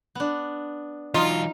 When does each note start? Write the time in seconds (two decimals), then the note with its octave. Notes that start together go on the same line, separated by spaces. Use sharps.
0.15 B3 D4
1.14 E3 F#3 D#4 F4